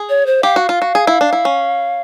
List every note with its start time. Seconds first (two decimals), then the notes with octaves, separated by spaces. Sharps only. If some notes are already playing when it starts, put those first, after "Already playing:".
Already playing: G#4
0.09 C#5
0.26 C5
0.43 G4 F5
0.56 F#4
0.69 F4
0.82 F#4
0.95 G#4
1.07 E4
1.21 D4
1.33 E4
1.45 C#4